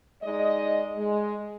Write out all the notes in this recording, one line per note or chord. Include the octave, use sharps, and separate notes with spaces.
G#3 D#4 D5 D#5
G#3